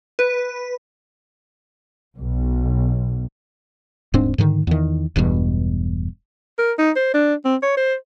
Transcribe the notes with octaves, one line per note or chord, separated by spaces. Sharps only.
B4
B1
D#1 G#2 C4 D4
G#2 D3 D#3
E2 D#3
E1 E2 G2 B2
A#4
D#4
C5
D4
C4
C#5
C5